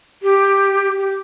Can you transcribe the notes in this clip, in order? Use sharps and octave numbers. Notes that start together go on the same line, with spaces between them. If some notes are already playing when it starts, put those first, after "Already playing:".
G4
G4